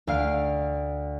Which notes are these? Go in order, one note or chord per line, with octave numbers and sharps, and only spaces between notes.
D2 F5 F6 D7